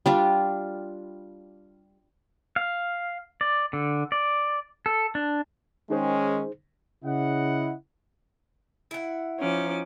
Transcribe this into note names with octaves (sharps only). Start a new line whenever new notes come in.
G3 D4 F4
F5
D5
D3
D5
A4
D4
D#3 G#3 C#4 D#4 G#4 C5
C#3 E4 D#5 F#5
E4 F#5
F3 C#4 D#4 D6